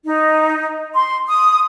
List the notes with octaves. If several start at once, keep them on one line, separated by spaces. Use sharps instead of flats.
D#4
C6
D#6